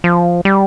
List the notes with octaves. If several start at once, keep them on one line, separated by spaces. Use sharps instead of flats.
F3
G3